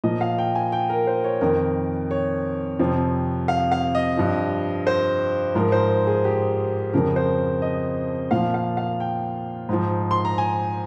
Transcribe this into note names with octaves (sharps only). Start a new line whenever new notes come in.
A#2 F3 D#5
F5
G5
G#5
G5
A#4
C5
C#5
F2 D#3 A#4
C#5
F2 C3 F3
F5
F5
D#5
G2 F3
C5
G#2 F3 A#4
C5
G#4
G4
F2 C#3 F3 A#4
C5
D#5
A#2 F3 F5
F5
F5
G5
G#2 F3
C6
A#5
G#5